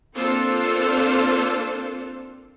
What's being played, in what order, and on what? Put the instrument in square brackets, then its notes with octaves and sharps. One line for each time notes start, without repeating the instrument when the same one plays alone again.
[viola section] A#3 C4 D4 F4 A4 C5